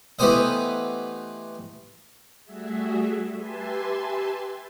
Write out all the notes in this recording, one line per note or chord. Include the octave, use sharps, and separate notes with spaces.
E3 A3 B3 G4 C5 D#5
G3 A3 F#4 G#4 E5
G4 B4 E5 G#5 A5 C6